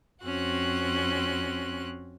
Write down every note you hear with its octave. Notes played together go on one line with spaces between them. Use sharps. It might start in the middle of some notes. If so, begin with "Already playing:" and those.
F2 C4 C#4 F#4 F#6